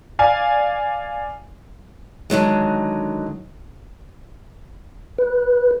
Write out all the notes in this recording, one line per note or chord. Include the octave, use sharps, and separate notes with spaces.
D5 F5 G#5
D3 D#3 F#3 G#3
B4